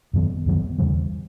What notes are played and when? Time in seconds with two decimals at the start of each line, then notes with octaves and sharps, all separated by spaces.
0.13 F#2 D#3 F#3 B3
0.46 F#2 D#3 F#3 B3
0.78 E2 C#3 E3 G3